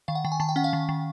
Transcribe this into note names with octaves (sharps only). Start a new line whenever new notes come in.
D#3 F5
F#5
D#3 G5
G#5
D#3 A5
G5
C#4 F#5
F5
D#3
D#3